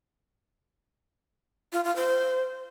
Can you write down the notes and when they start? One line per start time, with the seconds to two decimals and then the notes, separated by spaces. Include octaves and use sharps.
1.73 F4
1.84 F4
1.96 C5